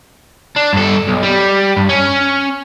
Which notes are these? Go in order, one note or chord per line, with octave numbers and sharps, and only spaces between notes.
D4
G2 A4
B1
G3
G2
C#4